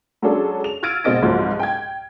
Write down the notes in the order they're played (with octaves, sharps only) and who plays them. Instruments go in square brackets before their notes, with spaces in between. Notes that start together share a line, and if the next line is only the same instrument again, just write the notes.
[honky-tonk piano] F#3 G#3 C#4 D4 G#4 A4
F7
E6 F6 G#6 A6 D7 D#7
B2 G#3 C4 D#5 A6 D7
C2 G#2 F3 F#3
G5 G#6